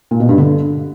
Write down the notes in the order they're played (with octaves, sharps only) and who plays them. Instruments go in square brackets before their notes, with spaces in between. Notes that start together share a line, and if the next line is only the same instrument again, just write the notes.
[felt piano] A#2
B2
G2
D3